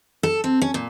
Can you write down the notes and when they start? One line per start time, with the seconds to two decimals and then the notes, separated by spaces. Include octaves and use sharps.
0.23 A4
0.44 C4
0.62 C#4
0.74 A#2